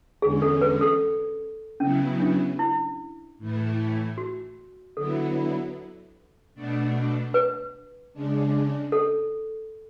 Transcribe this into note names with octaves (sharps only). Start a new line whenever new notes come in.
E2 D3 G#3 C#4 G#4
A4
B4
A4
C#3 F#3 B3 C#4 E4
D4
E4
A2 E3 A3 E4
F#4
D3 F#3 B3 E4 A4
B2 A3 D4
B4
C#3 G#3 D4
A4